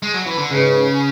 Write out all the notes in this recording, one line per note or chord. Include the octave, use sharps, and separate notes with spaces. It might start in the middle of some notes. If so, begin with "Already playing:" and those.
G#3
F#3
E3
D3
G#2 C#3 G#3 C#4 G#4 B4